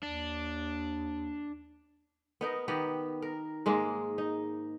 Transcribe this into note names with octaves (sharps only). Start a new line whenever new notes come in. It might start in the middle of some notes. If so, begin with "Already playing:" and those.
D#2 D4
B3 D#4 A#4
D#3 B3 G4
A#4
G#2 G#3 A#3
D#4